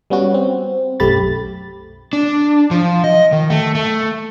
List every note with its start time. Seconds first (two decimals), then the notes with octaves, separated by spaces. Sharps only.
0.10 G3 B3 C#4 F#4
0.34 C4
1.00 B1 F#2 A3 G4 B5 A6
2.13 D4
2.71 F3
3.04 D#5
3.32 D#3
3.50 A3
3.75 A3